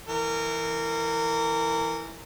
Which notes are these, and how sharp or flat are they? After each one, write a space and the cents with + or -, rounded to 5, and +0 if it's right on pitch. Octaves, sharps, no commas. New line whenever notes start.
E3 +0 A#4 -25